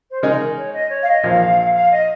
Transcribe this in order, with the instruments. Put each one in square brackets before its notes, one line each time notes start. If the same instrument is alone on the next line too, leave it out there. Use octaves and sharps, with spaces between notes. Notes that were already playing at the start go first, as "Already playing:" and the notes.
[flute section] C5
[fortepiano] C#3 G#3 D#4 G#4 [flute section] A#4
[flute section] C#5
D#5
C#5
F5
D#5
[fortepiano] A#1 A#2 F3 [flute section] F5
[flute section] F5
D#5